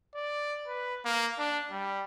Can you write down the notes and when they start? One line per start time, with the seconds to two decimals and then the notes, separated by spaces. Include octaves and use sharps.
0.15 D5
0.67 B4
1.05 A#3
1.38 D4
1.71 G3